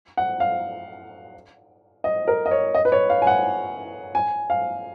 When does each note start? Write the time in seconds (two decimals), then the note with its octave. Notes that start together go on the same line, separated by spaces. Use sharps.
0.17 F#5
0.40 F5
2.04 D#5
2.28 A#4
2.46 D#5
2.51 C#5
2.75 D#5
2.85 B4
2.92 C#5
3.10 F5
3.22 G#5
3.27 F#5
4.15 G#5
4.50 F5